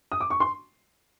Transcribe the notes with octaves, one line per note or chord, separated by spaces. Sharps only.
D#6
D6
C#6
C6